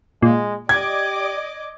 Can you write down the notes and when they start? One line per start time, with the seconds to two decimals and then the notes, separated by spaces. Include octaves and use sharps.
0.22 A#2 G#3
0.69 G4 D5 D#5 D6 G#6